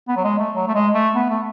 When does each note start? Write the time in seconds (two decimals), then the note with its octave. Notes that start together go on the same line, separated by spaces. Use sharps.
0.08 B3
0.17 F#3
0.24 G#3
0.39 A3
0.54 F#3
0.68 A3
0.74 G#3
0.94 A3
1.15 B3
1.30 A3